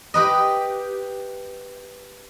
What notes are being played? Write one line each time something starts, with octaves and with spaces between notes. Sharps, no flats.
G4 B4 D#5